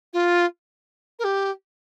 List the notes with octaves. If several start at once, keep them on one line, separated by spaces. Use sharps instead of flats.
F4
A#4
G4